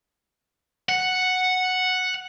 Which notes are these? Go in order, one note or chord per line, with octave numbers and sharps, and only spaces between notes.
F#5